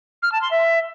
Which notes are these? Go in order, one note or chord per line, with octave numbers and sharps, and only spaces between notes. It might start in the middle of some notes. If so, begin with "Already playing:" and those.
F6
A5
C6
E5